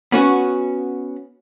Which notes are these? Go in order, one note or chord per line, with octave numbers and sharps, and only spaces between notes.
B3 C#4 F#4